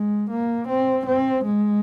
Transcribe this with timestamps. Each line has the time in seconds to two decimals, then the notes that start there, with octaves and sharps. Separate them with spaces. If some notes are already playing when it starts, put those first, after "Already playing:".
Already playing: G#3
0.31 A#3
0.68 C4
1.06 C4
1.45 G#3